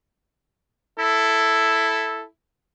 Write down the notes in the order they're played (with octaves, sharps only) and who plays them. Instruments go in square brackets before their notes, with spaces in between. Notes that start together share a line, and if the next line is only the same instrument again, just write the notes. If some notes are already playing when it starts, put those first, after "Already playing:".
[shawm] E4 [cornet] A4